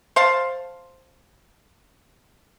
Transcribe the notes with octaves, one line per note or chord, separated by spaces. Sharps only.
C5 F5 A5